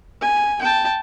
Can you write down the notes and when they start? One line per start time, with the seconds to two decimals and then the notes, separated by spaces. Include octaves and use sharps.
0.22 G#5
0.62 G5 A5